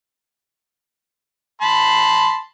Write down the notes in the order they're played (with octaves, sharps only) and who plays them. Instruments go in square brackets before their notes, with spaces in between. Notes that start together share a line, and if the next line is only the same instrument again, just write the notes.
[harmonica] A5 B5 C6